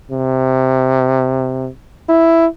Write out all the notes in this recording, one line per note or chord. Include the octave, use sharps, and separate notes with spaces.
C3
E4